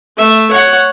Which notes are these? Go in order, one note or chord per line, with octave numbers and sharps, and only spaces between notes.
A3 E5
C#5 F#5